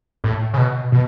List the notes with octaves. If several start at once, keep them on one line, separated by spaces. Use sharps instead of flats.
A2
C#3
B2
B2